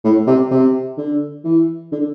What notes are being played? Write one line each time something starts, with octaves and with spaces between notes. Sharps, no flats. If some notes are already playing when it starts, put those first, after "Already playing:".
A2
C3
C3
D3
E3
D3